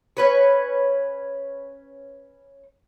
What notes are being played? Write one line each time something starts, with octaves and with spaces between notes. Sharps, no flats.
C#4 B4 C#5